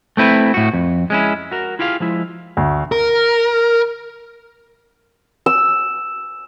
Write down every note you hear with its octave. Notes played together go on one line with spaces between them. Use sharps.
A3 C4 E4 B4
A2 F#4
F2
G#3 C#4 E4
F#4 A#4
E4 F4 G4 G#4 F5
F3 G#3 E4
D2
A#4
E6